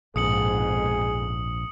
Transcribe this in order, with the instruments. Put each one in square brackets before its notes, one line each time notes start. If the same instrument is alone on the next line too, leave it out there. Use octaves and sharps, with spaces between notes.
[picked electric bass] A#1 [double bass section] F2 G#2 B2 [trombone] G#4 [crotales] D#6 C#7 F#7